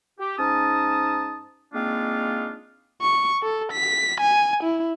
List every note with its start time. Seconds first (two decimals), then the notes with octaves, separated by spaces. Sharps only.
0.20 G4
0.38 G#2 C#4 D#4 A5 D#6
1.73 G#3 A#3 C4 D4 D#4 F4
3.01 C#6
3.43 A4
3.72 B6
4.21 G#5
4.63 E4